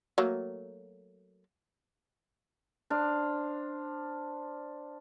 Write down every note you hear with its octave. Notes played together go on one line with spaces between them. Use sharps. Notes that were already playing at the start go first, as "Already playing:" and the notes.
F#3 A3 A#3
D4 C5 F5